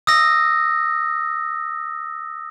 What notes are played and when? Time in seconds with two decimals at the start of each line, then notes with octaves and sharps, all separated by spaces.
0.07 D#6 E6 A#6